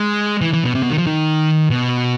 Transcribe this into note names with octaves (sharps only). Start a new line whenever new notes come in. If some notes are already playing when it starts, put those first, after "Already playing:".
Already playing: G#3
E3
E3
B2
C3
B2
D#3
F3
D#3
B2